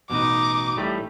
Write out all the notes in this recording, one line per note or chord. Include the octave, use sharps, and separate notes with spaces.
A1 B2 D#4 D6
A1 A2 G3 A3